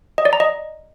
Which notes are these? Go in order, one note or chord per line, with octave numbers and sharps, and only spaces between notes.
D#5
D5
A#5
D#5